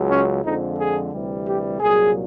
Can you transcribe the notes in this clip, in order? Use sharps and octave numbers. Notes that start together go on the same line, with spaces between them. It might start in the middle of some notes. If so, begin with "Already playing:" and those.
Already playing: C#2 C#3 F#3
C#4
F2 D3 F3 G#3 D#4
G#4
D2 C3 E3 G3
G4
C2 A#2 F#3 G#4